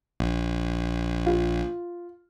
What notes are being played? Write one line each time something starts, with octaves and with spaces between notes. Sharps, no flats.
A#1
F4